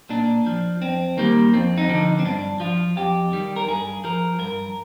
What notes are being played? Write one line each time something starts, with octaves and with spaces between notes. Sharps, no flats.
A#2 D4
F3
F2 C4
D#3 G3 A#3
F2 C4
D#4
D3 F3
C4
G2 D4
F3 F4
F2 G4
D#3 G3
A#4
G2 G#4
F3 A#4
G2 A#4